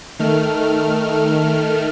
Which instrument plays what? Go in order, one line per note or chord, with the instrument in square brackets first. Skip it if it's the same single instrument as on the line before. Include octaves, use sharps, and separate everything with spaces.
[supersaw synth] D#3 A3 F6